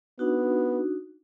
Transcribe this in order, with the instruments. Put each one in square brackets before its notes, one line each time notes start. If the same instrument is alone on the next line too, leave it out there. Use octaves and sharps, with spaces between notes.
[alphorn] B3 [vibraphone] D4 D#4 F#4